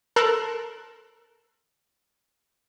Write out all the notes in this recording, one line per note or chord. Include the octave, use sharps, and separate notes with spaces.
A4 A#4 C6 E6 F#6